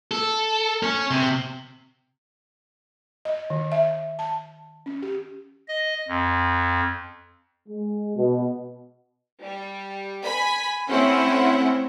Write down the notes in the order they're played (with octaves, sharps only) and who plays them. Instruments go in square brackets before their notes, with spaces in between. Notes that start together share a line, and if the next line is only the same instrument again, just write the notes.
[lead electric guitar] A4
C#4
C3
[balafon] D#5
D#3
E5
A5
C#4
G4
[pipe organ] D#5
F2
[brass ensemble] G#3
B2
[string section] G3
G#5 B5
A3 C4 C#4 E4 F#5